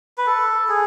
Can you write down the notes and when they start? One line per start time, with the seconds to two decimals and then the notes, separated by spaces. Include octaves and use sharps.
0.18 B4
0.27 A4
0.69 G#4